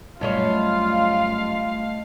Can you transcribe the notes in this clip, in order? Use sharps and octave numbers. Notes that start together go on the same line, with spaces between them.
F#2 G3 A3 F4 C#5 D#5 F5 A5